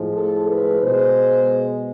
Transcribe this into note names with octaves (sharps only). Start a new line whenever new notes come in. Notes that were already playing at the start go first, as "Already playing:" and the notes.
Already playing: A2 F3 G#3
A4
B4
B2 G#3 C5